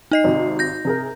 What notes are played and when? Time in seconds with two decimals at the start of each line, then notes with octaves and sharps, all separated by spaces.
0.11 D#4 D#5 C7
0.24 G#1 C3
0.59 G6 A#6
0.85 C3 G#4 A#4